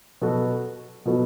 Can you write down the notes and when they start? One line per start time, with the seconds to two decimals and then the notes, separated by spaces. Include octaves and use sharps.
0.21 B2 F#3 B3 F#4 A4
1.05 B2 F#3 B3 F#4 A4